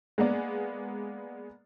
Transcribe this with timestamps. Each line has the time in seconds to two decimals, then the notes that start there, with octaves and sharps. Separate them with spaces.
0.18 G#3 A#3 B3 D5